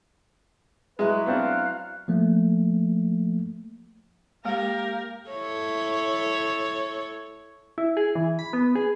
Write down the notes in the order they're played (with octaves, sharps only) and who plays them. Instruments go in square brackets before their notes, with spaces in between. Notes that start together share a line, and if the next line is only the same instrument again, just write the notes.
[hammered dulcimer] F#3 E4 [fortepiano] G#3 [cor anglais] B4
[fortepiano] B3 C4 D4 [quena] F5
[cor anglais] F#5
[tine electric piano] F3 A3 A#3
[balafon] G#3 A#3 [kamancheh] G4 F5 [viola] A#4
[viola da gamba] E4 A4 C#5
[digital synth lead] E4
G#4
E3
B5
B3
G#4